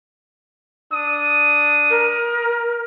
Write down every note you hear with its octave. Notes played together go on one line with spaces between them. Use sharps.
D4 D#6
A#4